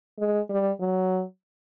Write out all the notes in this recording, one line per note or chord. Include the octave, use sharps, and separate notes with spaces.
G#3
G3
F#3